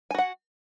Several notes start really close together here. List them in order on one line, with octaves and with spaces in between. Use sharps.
G#5 F#4 F#5